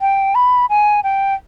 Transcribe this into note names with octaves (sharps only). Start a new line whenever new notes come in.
G5
B5
G#5
G5